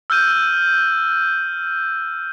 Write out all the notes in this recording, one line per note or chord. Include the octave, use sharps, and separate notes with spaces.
E6 F6 G6 D#7